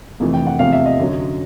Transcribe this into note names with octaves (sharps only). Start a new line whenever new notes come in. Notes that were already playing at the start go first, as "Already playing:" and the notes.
F2 C3 E3 A3
G5
F#5
E2 C3 F3 A3 F5
E5
D#5
F#2 D3 F#3